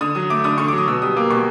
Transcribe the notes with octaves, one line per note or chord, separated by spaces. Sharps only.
D3 D#6
F#3 D#6
A3 D6
D3 D#6
D3 C#6
F#3 D6
D#6
B2 E6
G3 D#6
A#3 D6
B2 C#6